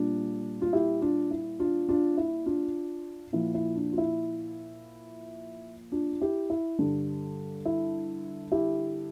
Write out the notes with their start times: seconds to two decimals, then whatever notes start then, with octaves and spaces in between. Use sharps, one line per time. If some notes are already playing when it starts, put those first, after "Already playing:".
Already playing: A#2 G3 D4 F4
0.62 F4
0.73 E4 G4
1.02 D4 F4
1.31 E4
1.60 D4 F4
1.89 D4 F4
2.17 E4
2.46 D4 F4
3.33 A#2 F3 E4
3.54 E4
3.76 D4
3.92 F4
3.98 E4
5.92 D4 F4
6.22 E4 G4
6.50 E4
6.79 G2 D3 G3 D4
7.65 E4
8.52 E4 G4